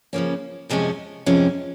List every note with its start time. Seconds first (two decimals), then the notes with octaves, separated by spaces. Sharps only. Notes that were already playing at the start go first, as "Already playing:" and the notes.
0.13 C#3 F3 A#3 C#4
0.70 F2 C3 F3 G#3 C#4
1.26 F2 C3 F3 G#3 C#4